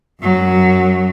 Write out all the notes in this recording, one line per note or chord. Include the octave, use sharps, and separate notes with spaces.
F#2 F#3